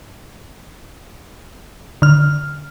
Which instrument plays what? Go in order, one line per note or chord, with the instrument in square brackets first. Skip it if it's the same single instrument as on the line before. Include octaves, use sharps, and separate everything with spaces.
[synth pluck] D3 F6